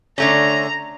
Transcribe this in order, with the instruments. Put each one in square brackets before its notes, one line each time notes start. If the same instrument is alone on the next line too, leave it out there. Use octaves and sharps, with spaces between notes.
[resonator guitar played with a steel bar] D3 A3 C#4 [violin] A#5